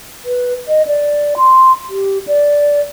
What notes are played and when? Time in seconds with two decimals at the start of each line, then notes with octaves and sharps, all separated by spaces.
0.25 B4
0.68 D#5
0.87 D5
1.37 C6
1.90 G4
2.27 D5